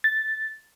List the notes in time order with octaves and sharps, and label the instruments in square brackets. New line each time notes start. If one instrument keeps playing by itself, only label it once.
[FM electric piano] A6